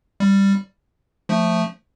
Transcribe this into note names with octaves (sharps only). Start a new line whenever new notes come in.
G3
F3 A3